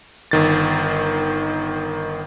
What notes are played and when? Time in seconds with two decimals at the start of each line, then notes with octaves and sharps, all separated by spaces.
0.31 G1 D#3 A6